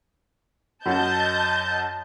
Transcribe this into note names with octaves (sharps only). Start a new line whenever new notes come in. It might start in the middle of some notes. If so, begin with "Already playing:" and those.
F#2 D#5 F#5 A5 G6